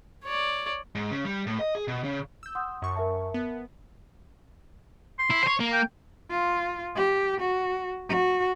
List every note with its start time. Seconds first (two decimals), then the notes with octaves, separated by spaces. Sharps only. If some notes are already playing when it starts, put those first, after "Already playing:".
0.24 C#5 D5
0.95 G#2
1.11 C#3
1.25 G3
1.47 A2
1.59 D#5
1.75 G#4
1.88 B2
2.03 C#3
2.43 E6 G6
2.55 F#5 C6 D#6
2.82 F#2 C#6
2.95 A#4 E5 A5
3.34 B3
5.19 C6
5.31 E4
5.44 C5 C#5
5.60 A#3
5.73 G5
6.30 F4
6.96 G4
7.41 F#4
8.09 F#4